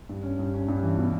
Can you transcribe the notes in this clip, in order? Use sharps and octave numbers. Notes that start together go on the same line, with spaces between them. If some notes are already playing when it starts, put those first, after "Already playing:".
G2
C#4
G2
C#4
G2
E3
B2